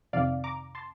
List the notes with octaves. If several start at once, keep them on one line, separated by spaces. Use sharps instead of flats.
F2 C3 D#3 D5 F5
A#5 D6
A5 C6